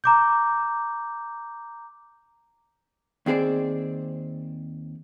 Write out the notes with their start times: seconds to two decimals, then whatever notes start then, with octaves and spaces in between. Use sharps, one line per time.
0.04 A#5 D6 G6
3.26 D#2 C4 G#4 C5 D5